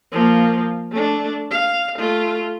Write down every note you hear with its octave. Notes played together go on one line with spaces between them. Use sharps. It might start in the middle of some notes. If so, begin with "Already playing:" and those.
F3 A#3
A3 D4
F5
A3 F4